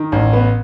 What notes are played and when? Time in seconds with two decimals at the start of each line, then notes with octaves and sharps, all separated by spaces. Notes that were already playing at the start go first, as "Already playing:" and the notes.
Already playing: D#3
0.12 A1
0.33 B3